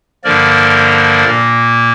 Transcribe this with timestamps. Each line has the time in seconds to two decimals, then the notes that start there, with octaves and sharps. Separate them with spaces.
0.24 G2 D3 F3 A#3 A#4 D5
1.25 A#2 A#3